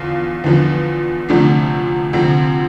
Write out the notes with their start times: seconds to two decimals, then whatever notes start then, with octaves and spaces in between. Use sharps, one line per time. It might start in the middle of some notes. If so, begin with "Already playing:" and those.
Already playing: E2 D3 F3 F5
0.44 E2 D3 F3 B3
1.29 D2 C3 F3 A3 D4
2.13 D2 C3 F3 C4